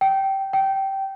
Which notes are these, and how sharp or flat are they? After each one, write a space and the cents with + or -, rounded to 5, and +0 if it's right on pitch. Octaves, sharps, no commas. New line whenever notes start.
G5 -15
G5 -15